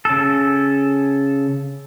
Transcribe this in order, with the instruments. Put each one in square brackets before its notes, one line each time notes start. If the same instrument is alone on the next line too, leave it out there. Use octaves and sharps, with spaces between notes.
[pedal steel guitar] C#3 A4